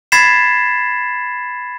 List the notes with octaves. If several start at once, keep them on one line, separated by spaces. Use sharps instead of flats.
B5 G#6 A6 B6 C7 E7